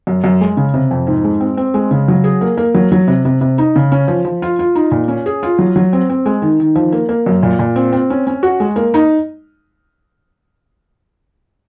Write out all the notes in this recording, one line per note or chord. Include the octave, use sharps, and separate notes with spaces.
F#2
F#2
G#3
C#3
C3
F2
G#2
G#3
C4
C4
G#3
C#3
F#3
G#4
A#3
A#3
F#3
F#3
C3
C3
C3
D#4
C#3
C#4
F3
F3
F4
F4
D#4
A#2
C#4
G#4
F4
F#3
F#3
C4
C4
G#3
D#3
D#3
F3
A#3
A#3
F#2
A#2
A#2
C4
C4
C#4
C#4
F#4
G#3
A#3
D#4